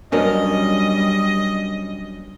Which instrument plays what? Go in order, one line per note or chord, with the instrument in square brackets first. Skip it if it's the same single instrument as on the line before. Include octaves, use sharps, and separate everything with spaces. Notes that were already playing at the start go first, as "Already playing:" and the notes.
[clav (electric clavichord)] F#2 B2 C#4 [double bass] G3 [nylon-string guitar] D4 A#4 [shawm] D#5